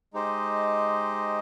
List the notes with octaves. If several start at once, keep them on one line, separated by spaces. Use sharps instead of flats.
G#3 D#4 G4 C5 D#5